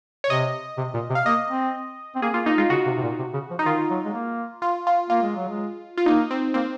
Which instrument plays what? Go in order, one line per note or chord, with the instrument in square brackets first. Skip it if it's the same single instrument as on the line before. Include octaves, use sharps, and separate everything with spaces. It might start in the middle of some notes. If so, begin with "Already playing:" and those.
[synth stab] C#5
[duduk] C3 [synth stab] D#5
[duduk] C3
A#2
C3
[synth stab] F5
[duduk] A#3 [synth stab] D#5
[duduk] C4
C4
[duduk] A#3 [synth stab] G#4
[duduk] A#3 [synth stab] F4
[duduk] A#3 [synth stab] D#4
[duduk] G#3 [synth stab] F4
[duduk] C#3 [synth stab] F#4
[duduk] C3
C3
A#2
C3
C#3
F3
[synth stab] D#4
[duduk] D#3 [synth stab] F4
[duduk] F#3
G#3
A#3
[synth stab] F4
F4
[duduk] A#3 [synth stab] F4
[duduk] G#3
F#3
G#3
[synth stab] F4
[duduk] A#3 [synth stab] D#4
[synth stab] C4
[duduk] A#3 [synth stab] C4